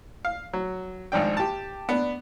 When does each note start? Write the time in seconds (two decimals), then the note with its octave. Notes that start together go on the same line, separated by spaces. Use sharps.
0.25 F5
0.53 F#3
1.12 G#1 G#2 F3 D4 G5
1.37 G4 A5
1.89 B3 D4